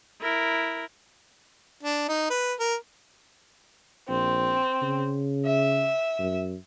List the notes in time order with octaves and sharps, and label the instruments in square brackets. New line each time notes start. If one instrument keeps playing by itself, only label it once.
[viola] E4 A#4
[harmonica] D4
D#4
B4
A#4
[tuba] A#1 [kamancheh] C4
[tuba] C#3
[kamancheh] E5
[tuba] F#2